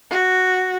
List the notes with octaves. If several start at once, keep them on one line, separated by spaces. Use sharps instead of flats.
F#4